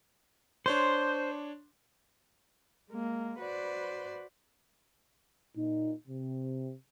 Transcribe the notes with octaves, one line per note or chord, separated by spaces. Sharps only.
D4 C5 C#5 C6
G#3 A#3
F#4 B4 C5 D5
A#2 D#4
C3